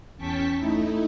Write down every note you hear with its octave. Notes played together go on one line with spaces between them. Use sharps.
E2 C#4 G5 A5 C#6 B6
A3 D#4 E4